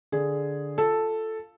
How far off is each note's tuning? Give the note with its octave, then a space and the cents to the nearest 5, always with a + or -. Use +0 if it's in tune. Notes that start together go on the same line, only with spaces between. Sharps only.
D3 +0 G#4 +0
F4 +0 A4 +0